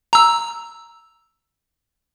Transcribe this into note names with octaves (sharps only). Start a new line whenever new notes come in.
A#5 E6